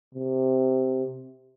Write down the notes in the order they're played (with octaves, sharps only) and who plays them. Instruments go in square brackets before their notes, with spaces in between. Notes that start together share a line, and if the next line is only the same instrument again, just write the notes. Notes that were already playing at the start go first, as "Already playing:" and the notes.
[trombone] C3